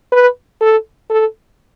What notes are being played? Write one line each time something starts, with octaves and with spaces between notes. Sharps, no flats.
B4
A4
A4